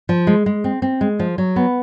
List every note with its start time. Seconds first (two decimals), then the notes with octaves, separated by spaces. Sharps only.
0.09 F3
0.27 G#3
0.46 G#3
0.64 C4
0.82 C4
1.01 G#3
1.19 F3
1.38 F#3
1.56 B3